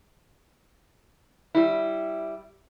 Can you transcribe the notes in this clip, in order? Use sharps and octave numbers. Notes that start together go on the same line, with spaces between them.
G3 E4